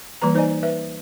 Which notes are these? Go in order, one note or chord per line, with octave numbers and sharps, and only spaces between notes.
E3 G3 A#3 B4 A#5
D#4 C5 D5 D#5 G#5
B4 E5